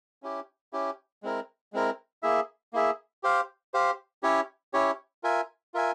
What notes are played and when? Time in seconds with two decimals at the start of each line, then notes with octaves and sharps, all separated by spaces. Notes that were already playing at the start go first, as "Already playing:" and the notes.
0.23 C#4 E4 G4
0.73 C#4 E4 G4
1.23 G#3 C4 E4 A#4
1.73 G#3 C4 E4 A#4
2.23 A#3 E4 G#4 E5
2.73 A#3 E4 G#4 E5
3.23 G4 C5 F5
3.74 G4 C5 F5
4.23 C#4 E4 G4 C#5
4.73 C#4 E4 G4 C#5
5.23 F4 A#4 E5 G#5
5.74 F4 A#4 E5 G#5